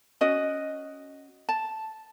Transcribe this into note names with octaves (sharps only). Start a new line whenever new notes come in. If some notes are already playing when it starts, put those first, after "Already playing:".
C#4 F#4 D#5
A5